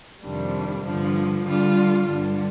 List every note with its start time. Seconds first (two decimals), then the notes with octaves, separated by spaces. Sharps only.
0.23 F2 C3 D#3 G3 D4
0.85 G2 D3 F3
1.46 D3 G3 D4 F4
2.06 G2 D3 G3 D4